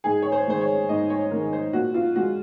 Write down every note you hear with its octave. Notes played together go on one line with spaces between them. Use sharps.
G#2 G#4
C#5
C5
D#3 G#3 C5
C#5
G#2 D#5
C#5
D#3 G#3 A#4
C5
A#2 F#4
F4
G#3 F#4